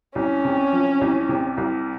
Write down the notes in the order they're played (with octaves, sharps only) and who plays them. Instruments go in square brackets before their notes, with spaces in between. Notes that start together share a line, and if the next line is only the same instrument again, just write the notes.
[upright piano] C2 [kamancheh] C#4
[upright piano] C3
F3
C2
C3
C2